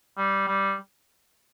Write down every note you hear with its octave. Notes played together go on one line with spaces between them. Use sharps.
G3
G3